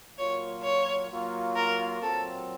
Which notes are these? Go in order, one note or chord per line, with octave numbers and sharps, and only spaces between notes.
A#2 F#3 A#3 F4 C#5
C#5
F#3 A#3 F4
A#4
A#2 F#3 C4 A4